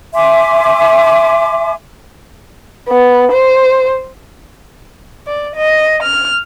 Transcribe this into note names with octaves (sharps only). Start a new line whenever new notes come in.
E5 G#5 C6 D6
B3
C5
D5
D#5
F6